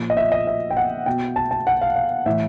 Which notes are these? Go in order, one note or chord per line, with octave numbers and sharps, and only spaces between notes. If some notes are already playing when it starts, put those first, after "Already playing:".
Already playing: A#2 F3
D#5
E5
D#5
E5
G5
F#5
B2 G5
A5
A5
F#5
F5
F5
A2 E3 E5